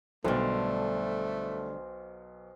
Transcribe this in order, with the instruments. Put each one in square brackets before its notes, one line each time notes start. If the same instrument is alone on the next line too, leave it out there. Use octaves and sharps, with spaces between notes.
[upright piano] B1 B2 [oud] D3 G3 [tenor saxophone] A3 [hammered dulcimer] C5 F5